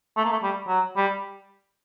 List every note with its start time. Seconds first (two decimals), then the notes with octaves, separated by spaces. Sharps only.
0.17 A3
0.25 A#3
0.32 A3
0.43 G3
0.68 F#3
0.96 G3